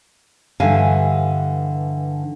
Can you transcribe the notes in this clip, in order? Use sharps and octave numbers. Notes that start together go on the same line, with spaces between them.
G2 D3 E3 E5 F5 G#5